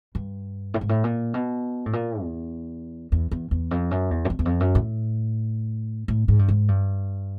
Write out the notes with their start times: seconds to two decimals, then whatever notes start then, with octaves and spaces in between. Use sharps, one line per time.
0.15 G2
0.74 A2
0.81 G#2
0.89 A2
1.04 A#2
1.34 B2
1.86 A2
1.93 A#2
2.22 E2
3.12 E2
3.31 E2
3.51 E2
3.71 F2
3.91 F#2
4.11 E2
4.25 F#2
4.30 F2
4.39 E2
4.45 F2
4.60 F#2
4.75 A2
6.08 A2
6.28 G#2
6.39 G2
6.49 G#2
6.68 G2